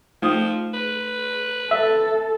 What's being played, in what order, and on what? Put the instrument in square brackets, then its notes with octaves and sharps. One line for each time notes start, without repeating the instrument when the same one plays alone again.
[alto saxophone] F3 [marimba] A3 D#4 D#6
[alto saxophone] B4
[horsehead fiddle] A4 [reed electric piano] E5